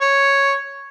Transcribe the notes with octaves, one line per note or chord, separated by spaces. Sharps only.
C#5